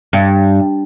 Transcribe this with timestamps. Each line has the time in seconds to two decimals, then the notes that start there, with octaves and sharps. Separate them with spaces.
0.13 G2